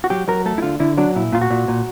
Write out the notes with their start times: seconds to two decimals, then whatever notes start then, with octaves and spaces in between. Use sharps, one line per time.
0.04 F#4
0.10 F#3 G4
0.28 F#3 A#4
0.46 A3 A4
0.58 E4
0.62 D3 F4
0.80 D3 E4
0.97 F#3 D4
1.16 A#2 E4
1.32 A#2 F4
1.41 F#4
1.51 A#2
1.68 A#2